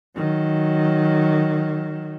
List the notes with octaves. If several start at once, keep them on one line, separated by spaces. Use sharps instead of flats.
D#3 F#3